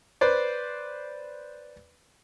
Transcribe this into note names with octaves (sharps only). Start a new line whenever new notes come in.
B4 C5 D5